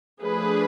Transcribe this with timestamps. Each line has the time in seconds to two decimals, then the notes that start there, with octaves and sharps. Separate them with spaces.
0.24 F3 A3 D4 G#4 B4